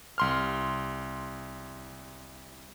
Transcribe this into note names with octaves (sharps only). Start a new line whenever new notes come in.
C2 C6 F6